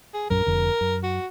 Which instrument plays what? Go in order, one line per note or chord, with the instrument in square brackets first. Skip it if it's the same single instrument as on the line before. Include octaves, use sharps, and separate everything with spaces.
[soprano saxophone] G#4
[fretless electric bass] A#1 F#2 F#3 [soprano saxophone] A#4
[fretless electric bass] F1 F2 D3
F#2
[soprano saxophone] F#4